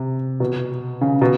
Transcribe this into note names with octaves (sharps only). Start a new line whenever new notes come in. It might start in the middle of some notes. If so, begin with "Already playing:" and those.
Already playing: C3
B2
C#3
B2